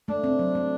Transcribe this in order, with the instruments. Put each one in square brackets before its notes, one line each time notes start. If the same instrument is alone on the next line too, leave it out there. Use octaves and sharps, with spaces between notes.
[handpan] A3 [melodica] D4
[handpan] C4
F#3
A3